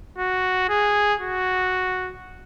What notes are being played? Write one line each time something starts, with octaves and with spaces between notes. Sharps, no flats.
F#4
G#4
F#4